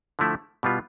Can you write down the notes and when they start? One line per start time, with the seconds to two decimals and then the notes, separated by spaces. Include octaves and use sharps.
0.19 D3 F3 A3 E4
0.63 B2 G3 B3 F4